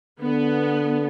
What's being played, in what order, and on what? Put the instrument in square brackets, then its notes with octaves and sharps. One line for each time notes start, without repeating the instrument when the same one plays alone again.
[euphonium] D3 [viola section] B3